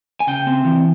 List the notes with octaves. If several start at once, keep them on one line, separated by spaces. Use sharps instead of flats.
G#5
C#3 G5
C4
E3